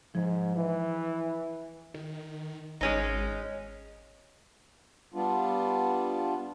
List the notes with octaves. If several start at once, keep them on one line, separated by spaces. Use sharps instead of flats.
G#2 F3
E3
D#3
G#1 G#3 C#4 D#4
G3 B3 D4 F4